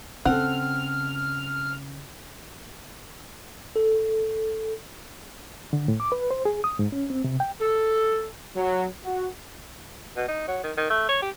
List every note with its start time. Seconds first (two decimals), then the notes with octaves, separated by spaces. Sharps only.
0.25 C#3 C4 A4 F#5 F6
3.76 A4
5.73 D3
5.88 A2
6.00 D6
6.12 B4
6.31 C5
6.45 G#4
6.64 D#6
6.79 G#2
6.92 C#4
7.10 C4
7.24 C3
7.40 G5
7.60 A4
8.56 F#3
9.04 F#4
10.16 B2
10.28 D#4
10.48 F#3
10.64 D#3
10.77 D#3
10.90 A3
11.09 C#5
11.22 G4